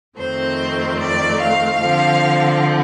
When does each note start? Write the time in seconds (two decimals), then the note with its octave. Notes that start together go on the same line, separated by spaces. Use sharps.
0.18 F2 D#3 A3 C4 C5
1.00 D5
1.42 F5
1.83 D3 F3 C4